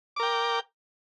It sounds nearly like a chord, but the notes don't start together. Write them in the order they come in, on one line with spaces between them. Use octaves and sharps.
D6 A#4 G5